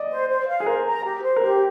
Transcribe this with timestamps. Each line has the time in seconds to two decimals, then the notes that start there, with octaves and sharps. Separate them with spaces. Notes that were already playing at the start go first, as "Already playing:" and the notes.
Already playing: D5 D#5
0.10 C5
0.29 C5
0.47 F5
0.60 G#4
0.66 A#4 C5
0.85 A#5
1.04 G4
1.22 C5
1.36 A#4
1.41 G4 C5